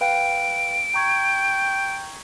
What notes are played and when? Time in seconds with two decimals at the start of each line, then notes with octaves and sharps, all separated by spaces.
0.01 B4 F5 G5 D7
0.94 G5 A#5 C#6 G#6